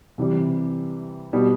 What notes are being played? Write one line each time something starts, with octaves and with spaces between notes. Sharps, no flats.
C3 E3 G3
B2 G3